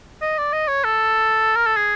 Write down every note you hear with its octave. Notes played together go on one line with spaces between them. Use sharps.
D#5
D5
D#5
C#5
A4
A#4
A4
G#4